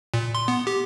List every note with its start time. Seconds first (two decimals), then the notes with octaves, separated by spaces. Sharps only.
0.14 A#2
0.35 C6
0.48 B3
0.67 G4